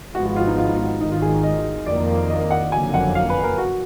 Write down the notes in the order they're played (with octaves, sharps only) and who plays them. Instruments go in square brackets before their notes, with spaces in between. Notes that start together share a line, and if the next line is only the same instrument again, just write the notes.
[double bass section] G#1 G#2 F3 G#3 B3 [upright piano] F#4
[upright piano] F#4
F4
D#4
F4
D#4
F4
[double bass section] G#1 G#2 D#3 [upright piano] D#4
[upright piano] F4
G#4
D#5
[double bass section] F2 D#3 A#3 [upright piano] D5
[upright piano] D#5
F#5
[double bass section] F#1 F2 D3 F#3 A#3 [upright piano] G#5
[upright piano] F#5
F5
B4
A#4
F#4